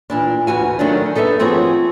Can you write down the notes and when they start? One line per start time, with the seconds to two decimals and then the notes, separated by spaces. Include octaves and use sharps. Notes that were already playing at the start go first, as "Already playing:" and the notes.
0.10 A#2 E3 D4
0.47 D2 E3 F#4 G#5
0.79 D#3 F#3 A3 C#4 D4
1.15 D#4 A4 B4 D#5 E5
1.40 F3 C4 F#4 G#4 B4 C#5